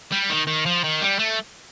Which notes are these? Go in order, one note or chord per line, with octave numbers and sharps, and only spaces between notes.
G3
D#3
D#3
F3
D#3
G3
A3